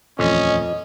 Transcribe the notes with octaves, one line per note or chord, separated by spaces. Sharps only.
D#1 F2 E3 A3 C#4 D#5